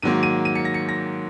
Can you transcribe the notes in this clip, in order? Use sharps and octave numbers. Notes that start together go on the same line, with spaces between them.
G#2 D#3 F#3 A#3 D#7
D#7
D#7
C#7
A#6
C#7
A#6